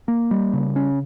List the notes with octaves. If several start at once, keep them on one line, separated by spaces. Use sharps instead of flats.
A#3
G3
C#3
C#4